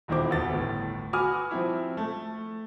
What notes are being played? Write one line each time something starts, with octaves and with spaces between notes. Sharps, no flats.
D#1 E2 D#3 E4 C5 D6
D2 B3 A6
G1 A2
F#4 B4 G#5 D6 D#6 F6
F3 C4 E4
A3